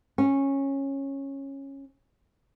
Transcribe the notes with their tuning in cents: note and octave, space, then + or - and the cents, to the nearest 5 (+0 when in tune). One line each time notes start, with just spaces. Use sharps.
C#4 -15